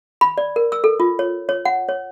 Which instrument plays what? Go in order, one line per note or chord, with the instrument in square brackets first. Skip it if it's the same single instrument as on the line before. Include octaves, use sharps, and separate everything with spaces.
[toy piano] B5
D5
A#4
E6
A4
F4
C#5
C#5
F#5
C#5